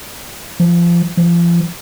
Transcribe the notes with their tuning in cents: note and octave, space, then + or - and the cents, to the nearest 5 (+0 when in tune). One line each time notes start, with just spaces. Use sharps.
F3 -25
F3 -35